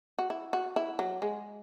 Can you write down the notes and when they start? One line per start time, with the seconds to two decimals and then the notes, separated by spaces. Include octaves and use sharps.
0.19 F#4
0.30 E4
0.53 F#4
0.76 E4
0.99 F#3
1.22 G#3